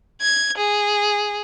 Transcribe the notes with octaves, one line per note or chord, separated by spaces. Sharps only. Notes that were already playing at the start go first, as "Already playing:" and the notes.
G#6
G#4